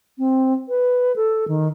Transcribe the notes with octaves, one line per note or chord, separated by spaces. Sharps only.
C4
B4
A4
D#3